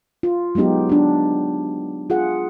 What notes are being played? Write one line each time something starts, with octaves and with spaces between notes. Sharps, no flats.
F4
F#3 G#3 B3 D#4 G4
D4 G4
F4 G#4 F#5